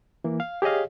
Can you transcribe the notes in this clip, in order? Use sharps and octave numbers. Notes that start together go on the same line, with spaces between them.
E3 A#3
F5
G4 G#4 C#5 D#5 F5